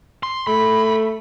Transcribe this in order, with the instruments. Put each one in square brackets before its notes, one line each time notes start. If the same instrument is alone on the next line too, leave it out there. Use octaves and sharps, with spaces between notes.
[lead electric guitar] C6
[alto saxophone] A3 [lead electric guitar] B5